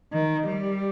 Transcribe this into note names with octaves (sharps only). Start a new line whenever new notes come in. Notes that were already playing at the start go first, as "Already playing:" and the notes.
D#3
G3